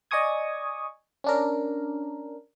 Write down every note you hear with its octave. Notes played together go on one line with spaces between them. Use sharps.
D5 D#5 G#5 C#6 D#6 G#6
C#4 D4 A#4